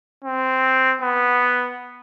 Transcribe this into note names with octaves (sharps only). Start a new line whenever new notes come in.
C4
B3